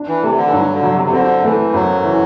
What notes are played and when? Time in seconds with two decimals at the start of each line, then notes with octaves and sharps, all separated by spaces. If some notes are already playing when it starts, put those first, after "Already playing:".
Already playing: D4
0.08 E3
0.23 C3 A3
0.37 D3
0.46 E3
0.52 G2 F#3
0.74 D3
0.83 F#3
0.94 C3
1.05 C3
1.13 D3 C4
1.44 E3 A3
1.73 F#2 F#3
2.04 E3